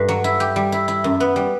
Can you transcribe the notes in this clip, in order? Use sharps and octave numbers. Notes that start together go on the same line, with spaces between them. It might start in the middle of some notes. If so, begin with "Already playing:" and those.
Already playing: G2 A3
F#3
E4
G4
G3
E4
E4
F#2
B3
G3